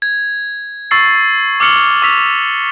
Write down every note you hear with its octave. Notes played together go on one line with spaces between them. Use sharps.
G#6
C#6 E6 A6 C7 C#7
D6 E6 F6 C#7 F7 G7
C#6 E6 B6 F7